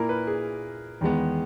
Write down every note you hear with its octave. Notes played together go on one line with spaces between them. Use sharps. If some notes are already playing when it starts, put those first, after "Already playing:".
Already playing: A#2 A#3 E4 A#4
B4
G#4
E2 D#3 G#3 B3